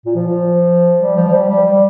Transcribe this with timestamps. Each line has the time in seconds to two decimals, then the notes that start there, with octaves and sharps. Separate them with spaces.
0.06 A#2
0.15 F3
0.27 F3
1.01 G3
1.16 F3
1.28 F3
1.33 G3
1.49 G3
1.66 G3